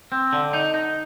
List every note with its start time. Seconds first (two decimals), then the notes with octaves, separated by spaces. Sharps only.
0.12 C4
0.33 D3
0.53 D#4
0.74 D#4